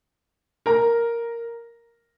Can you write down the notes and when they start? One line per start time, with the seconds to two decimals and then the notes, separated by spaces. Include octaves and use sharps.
0.66 A#4 A#5